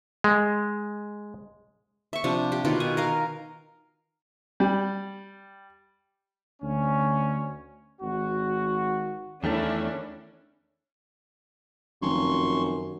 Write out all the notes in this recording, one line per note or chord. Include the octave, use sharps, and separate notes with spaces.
G#3
E5 C#6
C3 F3 D4
G4
B2 D#3 F4
G#5
A#4 D#5 F5
G3
D2 C#4
G#1 F#4
E2 D#3 A3 C#4 D4 E4
F1 F#2 D#3 F#3 C#4 C6 C#6